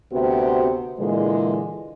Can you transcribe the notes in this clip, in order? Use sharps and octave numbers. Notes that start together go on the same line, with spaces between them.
D2 C3 B3 C4 F#4
A#2 D3 E3 G#3